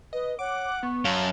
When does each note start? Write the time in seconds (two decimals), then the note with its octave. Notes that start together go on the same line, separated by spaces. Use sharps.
0.13 B4 D#5
0.39 C#5 F#5 D6
0.83 B3 C#6
1.05 F#2 F5 A5